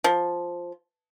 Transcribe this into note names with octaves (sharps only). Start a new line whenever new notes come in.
F3